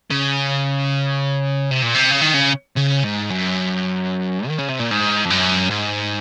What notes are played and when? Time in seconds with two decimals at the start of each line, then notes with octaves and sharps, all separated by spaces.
0.10 C#3
1.71 C3
1.82 A#2
1.94 C3
2.11 C#3
2.22 D#3
2.34 C#3
2.77 C#3
3.04 G#2
3.30 F#2
4.48 D#3
4.59 C#3
4.69 C3
4.80 A#2
4.91 G#2
5.25 F2
5.30 F#2
5.70 G#2